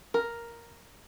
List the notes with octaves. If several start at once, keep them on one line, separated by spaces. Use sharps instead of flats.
A#4